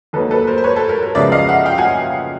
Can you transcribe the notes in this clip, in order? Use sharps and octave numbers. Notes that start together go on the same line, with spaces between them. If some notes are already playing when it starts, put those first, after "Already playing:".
D#2 D#3 F#3 A#3 D#4 A4 B4
A4 B4
A#4 C5
C5
B4 C#5
A4
A#4
A#4
C#2 C#3 F3 G#3 B3 D5 E5
D#5 F5
E5 F#5
F5 G5
F#5 G#5